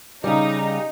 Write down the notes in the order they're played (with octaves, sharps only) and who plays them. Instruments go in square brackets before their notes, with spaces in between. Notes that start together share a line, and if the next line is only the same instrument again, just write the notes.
[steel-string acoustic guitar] C#3 G3 [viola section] D#4